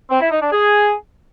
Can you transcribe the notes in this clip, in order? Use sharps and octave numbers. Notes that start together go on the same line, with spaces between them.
C4
E4
D#4
D4
G#4